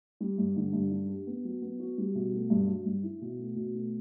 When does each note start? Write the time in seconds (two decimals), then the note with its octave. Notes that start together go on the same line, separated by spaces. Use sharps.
0.20 G3
0.38 G2
0.56 D3
0.73 G2
0.91 D4
1.09 G4
1.27 B3
1.45 F#3
1.62 B3
1.80 F#4
1.98 G3
2.15 B2
2.33 A3
2.50 G2
2.67 F#3
2.86 G2
3.03 E4
3.22 B2
3.39 A3
3.56 B2
3.74 A3